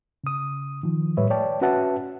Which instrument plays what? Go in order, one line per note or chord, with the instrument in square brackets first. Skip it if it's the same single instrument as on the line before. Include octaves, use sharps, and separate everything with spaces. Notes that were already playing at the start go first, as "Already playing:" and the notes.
[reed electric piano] C#3 D#6
D#3 F3
A2 G3 B4 C#5 E5
C#5 D5 G5 A5
C#4 F#4 B4 E5 F#5 A5